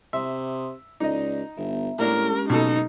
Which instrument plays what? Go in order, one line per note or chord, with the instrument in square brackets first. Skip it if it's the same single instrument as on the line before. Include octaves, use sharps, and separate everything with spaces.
[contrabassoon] C3 [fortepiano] E5 [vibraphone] C6 D#6
[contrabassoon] C#2 [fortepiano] D#4 D#5 [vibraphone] D5
[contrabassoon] G1 [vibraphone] B3 E5 A#5
[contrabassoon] A2 [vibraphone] G#3 C#4 G4 [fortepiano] A#3 D4 [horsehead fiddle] A#4
[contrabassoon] F#1 [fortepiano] B2 A4 [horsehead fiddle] D#4